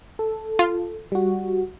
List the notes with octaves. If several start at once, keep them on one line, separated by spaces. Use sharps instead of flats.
A4
F4
G3 F#4